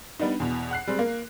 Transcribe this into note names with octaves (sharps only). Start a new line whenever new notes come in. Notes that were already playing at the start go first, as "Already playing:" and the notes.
G3 B3 D4 D#4
E2 B2
F#5 F#6 C7
G3 G#3 C4
A#3